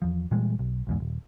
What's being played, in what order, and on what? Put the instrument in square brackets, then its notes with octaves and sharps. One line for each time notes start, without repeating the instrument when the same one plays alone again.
[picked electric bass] E2 F3
A#2 E3 G3 G#3
B1
B1 E2 G#2
D#1